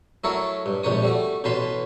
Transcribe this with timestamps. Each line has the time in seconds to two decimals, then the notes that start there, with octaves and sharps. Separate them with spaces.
0.24 F#3 A3 E4 A4 A#4 C#5
0.66 G2
0.83 A#1 G#2 C3 D4 C#5 D#6
1.02 G3 A3 F#4
1.44 A1 B2 C#4 B4 A5 C6